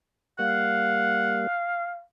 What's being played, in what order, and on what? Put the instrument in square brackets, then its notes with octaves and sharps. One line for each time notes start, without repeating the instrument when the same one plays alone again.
[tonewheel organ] G3 A#3 [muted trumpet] F5 [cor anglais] F#5